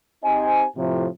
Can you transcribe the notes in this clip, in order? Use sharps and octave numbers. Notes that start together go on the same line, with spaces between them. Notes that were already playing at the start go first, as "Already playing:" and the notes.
C4 D#4 G4 C5 D#5 G#5
A2 C3 F3